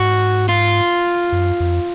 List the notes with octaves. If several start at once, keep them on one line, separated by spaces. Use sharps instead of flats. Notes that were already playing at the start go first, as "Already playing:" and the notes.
Already playing: G#2 F#4
F4
F#2
F2